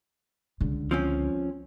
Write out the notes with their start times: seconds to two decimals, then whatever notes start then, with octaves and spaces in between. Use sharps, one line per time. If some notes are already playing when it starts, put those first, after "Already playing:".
0.60 C#2 D3
0.91 F3 C4 C#4